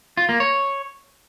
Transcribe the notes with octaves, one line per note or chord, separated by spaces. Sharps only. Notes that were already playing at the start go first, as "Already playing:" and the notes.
F4
A#3
C#5